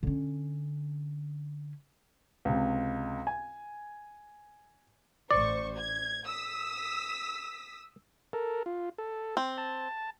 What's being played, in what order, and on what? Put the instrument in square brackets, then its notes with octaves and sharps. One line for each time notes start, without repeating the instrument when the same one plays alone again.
[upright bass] D3 C#4
[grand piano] C#2 C3
G#5
[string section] A1 C5 C#6 [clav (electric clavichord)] D5
[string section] G#6
D#6 E6 B6
[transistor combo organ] A4 A#4
F4
A4
[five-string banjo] C4
[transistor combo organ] A5